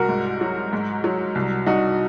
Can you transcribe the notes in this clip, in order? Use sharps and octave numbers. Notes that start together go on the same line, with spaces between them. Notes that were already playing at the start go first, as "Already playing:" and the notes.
Already playing: C2 F#4 A#4
G#2
F#3
G#2
F#3
C2
C2 D#4 F#4